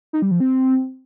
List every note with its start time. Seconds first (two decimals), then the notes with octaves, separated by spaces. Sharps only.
0.13 D#4
0.22 G3
0.31 F3
0.40 C4